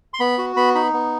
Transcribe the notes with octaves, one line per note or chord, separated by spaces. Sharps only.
C6
B3 B5
F#4
B3 B5
D#4 B5
B3